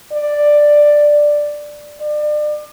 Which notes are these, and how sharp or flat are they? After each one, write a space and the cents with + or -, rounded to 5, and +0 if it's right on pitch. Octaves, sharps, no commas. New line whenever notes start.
D5 +5
D5 +35